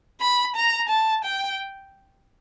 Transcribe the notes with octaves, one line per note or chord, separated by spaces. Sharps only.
B5
A#5
A5
G5